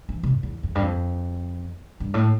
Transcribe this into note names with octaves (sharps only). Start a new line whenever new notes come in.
E3
C3
F2
E2
F2
G2
F2
G2
A2